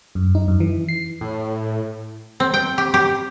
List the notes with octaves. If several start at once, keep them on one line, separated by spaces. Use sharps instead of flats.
F#2
D#4
F#2
E3
C7
A2
C4
G5
G4
G4